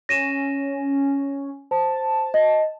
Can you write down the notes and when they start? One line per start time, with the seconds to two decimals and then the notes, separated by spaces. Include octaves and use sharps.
0.09 C#4 A#6 D#7 E7
1.71 C5 A5
2.34 D#5